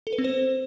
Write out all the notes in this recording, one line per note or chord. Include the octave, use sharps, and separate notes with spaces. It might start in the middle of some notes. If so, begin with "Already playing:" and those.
A4
B4
C4
C5